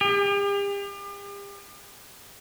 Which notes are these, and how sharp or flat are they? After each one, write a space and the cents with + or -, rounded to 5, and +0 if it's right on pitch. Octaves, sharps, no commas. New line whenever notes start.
G4 +40